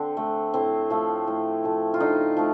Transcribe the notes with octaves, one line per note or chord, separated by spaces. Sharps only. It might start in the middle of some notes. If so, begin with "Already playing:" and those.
Already playing: D3 C4
A3
A2 C4
F3 A3
A2
F3 A3
F4
D3 D#4
F3 A3